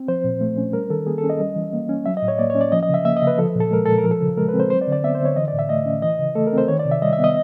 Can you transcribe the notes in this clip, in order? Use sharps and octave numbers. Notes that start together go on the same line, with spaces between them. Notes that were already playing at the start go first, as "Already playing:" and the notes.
Already playing: C4
F3 C5
A#2
A3
C#4
G3 A#4
D#3 A4
A#3 G#4
A4
C#4
D#5
G3
E3
A#3
C#4
F#3 E5
D#5
A2
C#5
A#3 D5
C#5
C#4
D5
F3 D#5
D#5
C#3
E5
A#3 E5
D#5
C#3
B4
F3 A4
A#2
A4
G#3 A#4
A#2 A4
A#4
F3
A4
C#3
G#3 A#4
B4
C4
C5
F#3 C5
D5
D3
D5
B3 E5
C5
D3
C#5
E3 D#5
D5
A2
E5
A3 D#5
C#4
E3 D#5
C#3
A3 A4
A#4
C4 C5
D#3 C#5
D5
C3
E5
G3 D#5
E5
B3
D#5